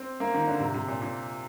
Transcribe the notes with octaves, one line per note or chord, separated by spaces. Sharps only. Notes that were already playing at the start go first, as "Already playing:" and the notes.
Already playing: C4
A#3
D#3
D3
C3
C3
A#2
A#2